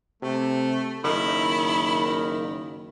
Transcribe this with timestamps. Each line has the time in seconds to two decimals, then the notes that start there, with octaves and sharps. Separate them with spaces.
0.22 C3 A3
1.04 F#1 D#3 E4